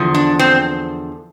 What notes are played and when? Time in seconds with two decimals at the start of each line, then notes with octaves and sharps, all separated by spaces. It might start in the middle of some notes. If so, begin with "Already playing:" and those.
Already playing: E2 D3 F3
0.14 D4
0.39 C4